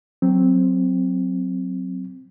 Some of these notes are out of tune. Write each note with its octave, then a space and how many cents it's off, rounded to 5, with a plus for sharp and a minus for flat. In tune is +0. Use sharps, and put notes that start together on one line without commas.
F#3 +0 C4 +0